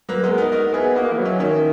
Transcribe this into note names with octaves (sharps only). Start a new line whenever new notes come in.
F#3 A#3 B4
G#3 B3
A#4
B3 D#4
D#4 F#4 A#4
B3 E4 G#4
A#3 D#4 F#4
E3
F#3
C#4 E4
D#3 C#4 E4